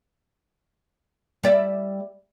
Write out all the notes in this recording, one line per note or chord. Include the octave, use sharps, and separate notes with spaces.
G3 D5 E5